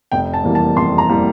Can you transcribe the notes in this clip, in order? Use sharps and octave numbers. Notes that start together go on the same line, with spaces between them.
F1 G5
A5
E2 E3 G3 A#3
A5
F1 C6
A#5
E3 G3 A#3